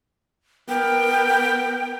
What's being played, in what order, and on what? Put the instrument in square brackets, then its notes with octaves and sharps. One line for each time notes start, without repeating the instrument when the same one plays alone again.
[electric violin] B3 A#4 [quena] G5